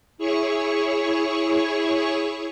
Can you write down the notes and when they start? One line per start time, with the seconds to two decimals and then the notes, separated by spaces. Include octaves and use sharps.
0.18 E4 G#4 C#5 C#6